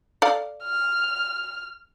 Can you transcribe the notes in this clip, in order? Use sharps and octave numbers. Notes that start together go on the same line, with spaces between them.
A4 D5 F5
F6